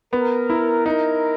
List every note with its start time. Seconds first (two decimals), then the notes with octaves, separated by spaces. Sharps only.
0.13 B3 A#4
0.50 E4
0.86 D#4 A#4